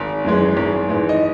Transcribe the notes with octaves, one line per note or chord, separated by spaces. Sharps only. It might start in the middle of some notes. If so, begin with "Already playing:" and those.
Already playing: G#1
F#2 E3 G#3
G#1
G#2 E3
D#5